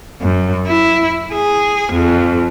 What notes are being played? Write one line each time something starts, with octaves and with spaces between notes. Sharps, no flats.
F#2
E4
G#4
F2